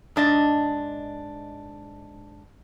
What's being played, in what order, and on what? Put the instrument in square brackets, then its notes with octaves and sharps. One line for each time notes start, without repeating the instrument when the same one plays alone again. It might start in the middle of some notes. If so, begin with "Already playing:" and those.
[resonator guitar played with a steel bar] G#2 D4 D#5